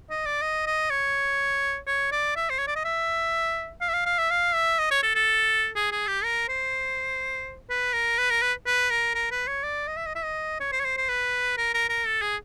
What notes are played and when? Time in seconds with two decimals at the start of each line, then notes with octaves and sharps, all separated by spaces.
0.10 D#5
0.26 D5
0.42 D#5
0.66 D#5
0.90 C#5
1.87 C#5
2.12 D5
2.36 E5
2.50 C5
2.58 C#5
2.67 D5
2.75 D#5
2.84 E5
3.81 F5
3.88 E5
3.93 F5
4.06 F5
4.18 E5
4.30 F5
4.54 E5
4.78 D#5
4.91 C#5
5.03 A4
5.15 A4
5.75 G#4
5.91 G#4
6.07 G4
6.24 A#4
6.48 C5
7.70 B4
7.93 A#4
8.18 B4
8.30 A#4
8.42 B4
8.66 B4
8.91 A#4
9.15 A#4
9.31 B4
9.47 C#5
9.63 D5
9.87 D#5
9.97 E5
10.06 D#5
10.15 E5
10.24 D#5
10.60 C#5
10.72 C5
10.80 C#5
10.85 C5
10.97 C5
11.09 B4
11.57 A#4
11.74 A#4
11.89 A#4
12.06 A4
12.22 G#4